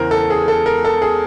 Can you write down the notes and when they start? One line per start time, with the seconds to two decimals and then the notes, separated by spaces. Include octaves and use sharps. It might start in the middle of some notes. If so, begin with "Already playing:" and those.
Already playing: E2 C#3 E3 A#4 C5
0.11 A4
0.30 G#4
0.48 A4
0.66 A#4
0.85 A4
1.02 G#4